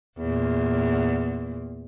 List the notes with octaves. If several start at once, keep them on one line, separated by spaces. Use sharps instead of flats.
E2 A#2